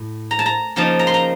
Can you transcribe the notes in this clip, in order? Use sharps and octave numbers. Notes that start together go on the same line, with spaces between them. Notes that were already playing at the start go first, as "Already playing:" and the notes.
Already playing: A2
A#5
A5
A#5
C#3 F3 A#3 D#4 A5
A#5
C6
A#5